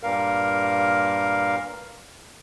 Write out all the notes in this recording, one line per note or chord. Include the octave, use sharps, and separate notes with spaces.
G2 A#2 A#4 F5